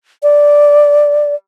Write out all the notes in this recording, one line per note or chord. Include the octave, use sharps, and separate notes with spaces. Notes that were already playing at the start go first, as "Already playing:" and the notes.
D5